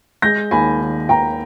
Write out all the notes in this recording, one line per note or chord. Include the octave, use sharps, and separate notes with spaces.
G#3 G6 A#6
D#2 G#5 B5
D#3
D#2 G5 A#5